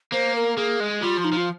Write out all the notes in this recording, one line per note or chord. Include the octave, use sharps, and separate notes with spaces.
A#3 C5
A#4
A#3 G#4
G#3
G3 F4
F3
D#4
F3 F4